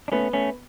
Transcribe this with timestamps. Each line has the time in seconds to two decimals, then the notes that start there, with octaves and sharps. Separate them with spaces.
0.08 D4
0.12 A3 B3 C#4
0.33 A3 C#4